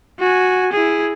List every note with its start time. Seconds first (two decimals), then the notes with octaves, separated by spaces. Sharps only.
0.19 F#4 G#5
0.73 E4 G#4